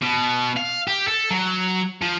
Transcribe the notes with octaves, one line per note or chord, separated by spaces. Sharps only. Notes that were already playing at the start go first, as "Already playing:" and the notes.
B2
F5
G4
A4
F#3
F3